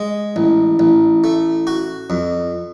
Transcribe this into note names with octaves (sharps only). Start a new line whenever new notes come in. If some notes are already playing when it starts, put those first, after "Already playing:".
Already playing: G#3
A1
A1
A3
F#4
F2